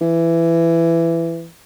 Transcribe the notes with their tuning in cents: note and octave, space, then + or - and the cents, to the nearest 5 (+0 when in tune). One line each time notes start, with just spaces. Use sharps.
E3 +15